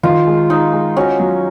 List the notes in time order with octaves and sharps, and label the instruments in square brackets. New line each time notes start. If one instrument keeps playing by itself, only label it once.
[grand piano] D#3 [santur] F4
[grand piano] G#3
[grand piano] G#3 [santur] D#4
[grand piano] G#3
[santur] C#4 [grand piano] F#4
[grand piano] F#3